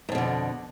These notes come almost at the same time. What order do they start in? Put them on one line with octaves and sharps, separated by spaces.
G#2 F2 B2 D3